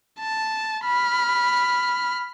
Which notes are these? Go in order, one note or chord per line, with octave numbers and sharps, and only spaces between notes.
A5
B5 F6